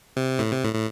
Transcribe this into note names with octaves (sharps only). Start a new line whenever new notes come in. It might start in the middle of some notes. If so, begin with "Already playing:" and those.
C3
A2
C3
A2
A2